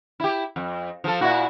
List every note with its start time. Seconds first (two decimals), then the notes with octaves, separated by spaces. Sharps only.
0.20 E4 G4
0.56 F2
1.04 F3 A4
1.21 A#2 E4 F#4